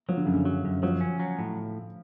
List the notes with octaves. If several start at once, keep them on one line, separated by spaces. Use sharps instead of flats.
F3 F#3
D3
F#2 C#3
D3
F#3
F#2
F3 F#3
C#4
F#3
A2